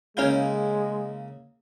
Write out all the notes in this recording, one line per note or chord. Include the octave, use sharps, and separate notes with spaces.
C#3 G#3 A#3 C#4 E4 F5 G6